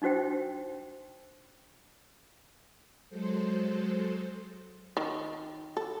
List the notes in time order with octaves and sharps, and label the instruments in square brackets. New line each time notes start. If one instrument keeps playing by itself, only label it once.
[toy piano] D4 D#4 F#4 C5 G5
[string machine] F#3 G#3 A4 C5
[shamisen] D#3
A4